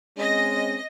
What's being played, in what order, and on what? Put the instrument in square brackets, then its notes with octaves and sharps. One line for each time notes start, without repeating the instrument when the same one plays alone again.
[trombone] G#3 [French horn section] C4 C#4 [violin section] D#5 A#6